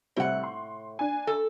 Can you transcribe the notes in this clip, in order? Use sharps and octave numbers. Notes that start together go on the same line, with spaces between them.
A2 C3 G3 C4 F#5
C6
D4 G#5
A4